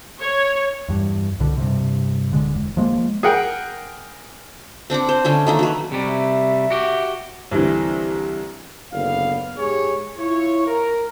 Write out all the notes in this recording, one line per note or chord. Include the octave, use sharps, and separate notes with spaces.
C#5
E2 G2
C2 B2 D3
G2 C3
D1 D3 G#3
E1
F3 G#3 A#3
G#4 A#4 F#5 G5
C4 D4 F#5 D6
C5
D3 A3 C#4
D#3 A3 A#3
F#3 B4
C3 G3
E5
F#4 G4
C2 D3 E3
F#1 D3 B3 F5
G#2 G4 G#4 C#5
E4 F4 C#5
A#4